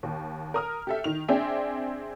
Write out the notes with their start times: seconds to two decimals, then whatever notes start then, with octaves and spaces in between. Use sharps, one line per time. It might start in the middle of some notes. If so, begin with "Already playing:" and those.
0.03 D#2
0.54 A#4 D#6 F6
0.87 G4 A4 E5
1.04 D#3 F7
1.28 C4 D4 G#4 D5 E5 G5